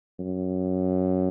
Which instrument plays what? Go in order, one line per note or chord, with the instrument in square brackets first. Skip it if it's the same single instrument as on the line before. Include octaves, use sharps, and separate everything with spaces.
[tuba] F#2